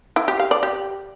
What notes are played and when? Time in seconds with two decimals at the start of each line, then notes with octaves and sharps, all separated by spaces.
0.16 E4
0.28 G4
0.39 F5
0.51 D5
0.63 G4